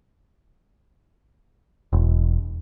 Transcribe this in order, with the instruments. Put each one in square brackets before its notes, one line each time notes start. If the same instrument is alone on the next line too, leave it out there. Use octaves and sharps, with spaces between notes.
[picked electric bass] E1